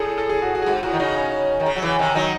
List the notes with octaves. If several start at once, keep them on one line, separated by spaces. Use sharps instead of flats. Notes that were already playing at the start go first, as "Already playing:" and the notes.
Already playing: A2 G#4 A4
A4
G#4
F#4
F#4
G#4
G#2 F#4
A2 F#4
D#3
C#3 D#4
C#4
D#3
C#3
F#3
C#3 E3
C3 D#3
D#3 F#3 D#4